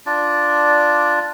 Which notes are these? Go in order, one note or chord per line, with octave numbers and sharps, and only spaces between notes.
D4 F4 D5